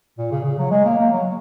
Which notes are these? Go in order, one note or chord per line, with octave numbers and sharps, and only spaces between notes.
A#2
C#3
C#3
F#3
G#3
A#3
A#3
F#3